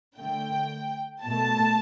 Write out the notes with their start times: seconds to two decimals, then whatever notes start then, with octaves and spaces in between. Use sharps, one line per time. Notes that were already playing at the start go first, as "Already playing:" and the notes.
0.18 D3 A3 G5
1.24 B2 A3 A5